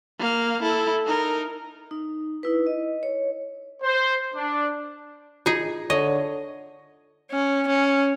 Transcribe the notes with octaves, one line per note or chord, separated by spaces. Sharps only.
A#3 F5
E4 A4
D#4 A#4
D#4
D#4 E4 B4
D#5
C#5
C5
D4
D#4 F4 G#4
D3 C#5 D#5
C#4
C#4